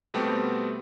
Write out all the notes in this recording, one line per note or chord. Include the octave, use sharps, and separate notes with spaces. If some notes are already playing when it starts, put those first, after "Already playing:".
B2 G3 A3 B3 C4 G4